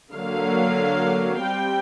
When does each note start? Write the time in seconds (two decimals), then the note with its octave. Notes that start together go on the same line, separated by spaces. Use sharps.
0.12 D3 F#3 A#3 F5
1.40 G3 C4 G5